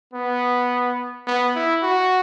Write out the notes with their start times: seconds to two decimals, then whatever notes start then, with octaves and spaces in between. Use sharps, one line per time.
0.14 B3
1.27 B3
1.55 E4
1.83 F#4